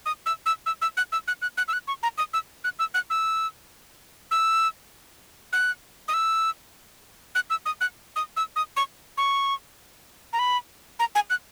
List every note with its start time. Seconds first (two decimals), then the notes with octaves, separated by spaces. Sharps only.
0.06 D#6
0.26 E6
0.46 E6
0.66 E6
0.82 E6
0.97 F#6
1.12 E6
1.28 F#6
1.42 F#6
1.57 F#6
1.68 E6
1.73 F#6
1.88 C#6
2.03 A#5
2.18 D#6
2.33 E6
2.64 F#6
2.79 E6
2.94 F#6
3.10 E6
4.31 E6
5.53 F#6
6.08 D#6
6.14 E6
7.35 F#6
7.50 E6
7.66 D#6
7.81 F#6
8.16 D#6
8.37 E6
8.56 D#6
8.77 C#6
9.18 C#6
10.33 A#5
10.39 B5
10.99 A#5
11.15 G#5
11.30 F#6